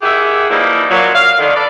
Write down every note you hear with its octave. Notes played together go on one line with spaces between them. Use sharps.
D#3 E4 G4 G#4 E5 F#5
E3 F3 G3 A#3 D#4 E4
A#2 F#3
F5
D3 D#3
D4 A4 B4 D5